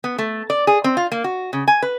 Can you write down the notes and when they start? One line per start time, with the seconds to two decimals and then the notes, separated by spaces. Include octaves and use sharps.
0.04 B3
0.18 A3
0.50 D5
0.67 G#4
0.84 C4
0.97 F4
1.12 A#3
1.24 F#4
1.53 C#3
1.68 G#5
1.82 B4